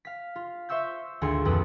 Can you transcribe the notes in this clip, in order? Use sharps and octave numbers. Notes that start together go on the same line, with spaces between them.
F5 B6
F4
C5 E5 C#6 E6 G6
G#1 D2 F4 G#5 C6 C#7
D#1 F2 A#2 B4 D#6 D#7